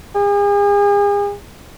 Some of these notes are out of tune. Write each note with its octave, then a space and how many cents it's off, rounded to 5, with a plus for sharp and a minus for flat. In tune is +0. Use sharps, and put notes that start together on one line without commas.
G#4 -40